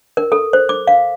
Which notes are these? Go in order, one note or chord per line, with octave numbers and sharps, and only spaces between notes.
A#4
A4
C5
D6
F5